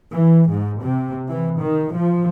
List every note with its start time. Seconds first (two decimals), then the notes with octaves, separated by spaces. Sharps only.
0.12 E3
0.50 G#2
0.82 C3
1.28 E3
1.60 D#3
1.94 F3